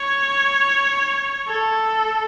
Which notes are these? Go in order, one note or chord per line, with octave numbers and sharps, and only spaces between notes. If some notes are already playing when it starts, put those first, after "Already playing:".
Already playing: C#5
A4